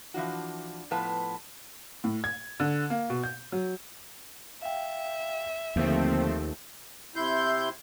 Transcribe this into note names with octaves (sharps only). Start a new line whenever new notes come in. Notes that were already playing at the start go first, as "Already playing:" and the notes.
E3 F3 D4 F#4
A2 F3 B3 B4 A5
A2
G#6
D3
A#3
B2
G6
F#3
E5 F5 G5
D#2 D3 F3 A3 A#3 C4
C3 E4 C6 G6